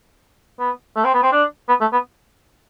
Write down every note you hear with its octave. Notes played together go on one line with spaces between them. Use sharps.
B3
A3
C4
B3
C4
D4
B3
A3
B3